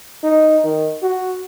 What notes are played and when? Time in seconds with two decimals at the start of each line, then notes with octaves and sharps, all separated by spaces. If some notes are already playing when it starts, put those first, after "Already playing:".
0.24 D#4
0.64 D#3
1.02 F#4